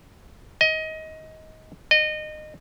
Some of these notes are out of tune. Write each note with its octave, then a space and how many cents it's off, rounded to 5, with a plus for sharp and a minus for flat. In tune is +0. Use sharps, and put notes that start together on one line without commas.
D#5 +20
D#5 -25